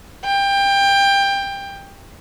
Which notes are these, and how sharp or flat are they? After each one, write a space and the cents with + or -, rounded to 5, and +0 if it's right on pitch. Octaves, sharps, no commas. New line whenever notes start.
G5 +20